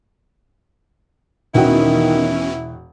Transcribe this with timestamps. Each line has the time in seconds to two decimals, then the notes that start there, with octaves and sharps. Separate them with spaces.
1.54 E1 B2 D#3 E3 C#4 E4 F#4 G5